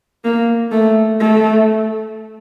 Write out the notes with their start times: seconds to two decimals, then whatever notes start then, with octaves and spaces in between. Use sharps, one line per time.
0.24 A#3
0.72 A3
1.20 A3